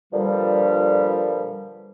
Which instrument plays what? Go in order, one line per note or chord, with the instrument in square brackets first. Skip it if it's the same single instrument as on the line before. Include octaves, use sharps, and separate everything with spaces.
[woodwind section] G2 A#2 D3 F3 G3